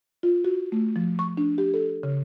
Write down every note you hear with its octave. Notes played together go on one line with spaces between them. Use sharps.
F4
F#4
A3
F3
C#6
D4
G4
A4
C#3